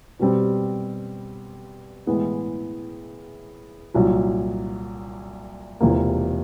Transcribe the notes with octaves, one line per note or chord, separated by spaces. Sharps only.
B2 G3 C4
A2 E3 G#3 B3
C2 A#2 F#3
E1 E2 C3 F3 A#3